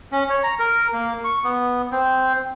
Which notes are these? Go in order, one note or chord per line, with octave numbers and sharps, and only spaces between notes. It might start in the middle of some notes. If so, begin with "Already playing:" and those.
C#4
C#5
A#5
A#4
A#3
C#6
B3
C4